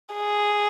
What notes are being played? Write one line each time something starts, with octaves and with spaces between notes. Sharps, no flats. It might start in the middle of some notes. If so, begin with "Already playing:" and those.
G#4